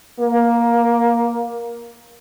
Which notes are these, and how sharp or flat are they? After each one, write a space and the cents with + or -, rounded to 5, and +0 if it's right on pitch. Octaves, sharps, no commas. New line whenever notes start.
A#3 +10